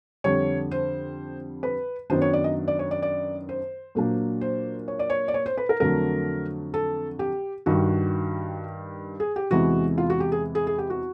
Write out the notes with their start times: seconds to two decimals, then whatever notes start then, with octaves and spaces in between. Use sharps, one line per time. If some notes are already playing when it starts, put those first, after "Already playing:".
0.24 F2 D3 G3 C#5
0.71 C5
1.63 B4
2.10 F#2 D#3 F#3 B3 D4 C5
2.22 C#5
2.33 D5
2.44 D#5
2.68 D5
2.79 C#5
2.91 D5
3.02 D5
3.49 C5
3.95 A#2 F#3 A#3 D4
4.41 C5
4.88 C#5
4.99 D5
5.10 C#5
5.28 D5
5.34 C#5
5.46 C5
5.57 B4
5.69 A#4
5.80 F2 D3 F#3 A3 A#4
6.74 A4
7.19 G4
7.66 G2 D#3 G3 F#4
9.20 G#4
9.36 G4
9.51 E2 C3 E3 G#3 F#4
9.98 F4
10.10 F#4
10.20 G4
10.32 G#4
10.55 G#4
10.67 G#4
10.78 G4
10.90 F#4